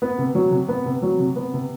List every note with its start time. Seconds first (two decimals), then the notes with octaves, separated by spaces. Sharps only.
0.02 B3
0.18 C3
0.35 F#3
0.52 C3
0.68 B3
0.86 C3
1.02 F#3
1.20 C3
1.36 B3
1.54 C3